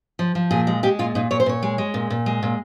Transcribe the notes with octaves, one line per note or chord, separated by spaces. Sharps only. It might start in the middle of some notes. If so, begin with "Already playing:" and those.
F3
F3
A#2 G#4
G#3
G#3 G4
A#2 F4
A#2 D#4
A#2 C#5
C5
A#2 C#5
G#3
G#3
A#2
A#2
G#3
A#2